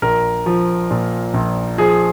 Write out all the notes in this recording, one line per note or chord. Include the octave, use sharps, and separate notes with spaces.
A#1 A#4
F3
A#2
A#1
F3 G#4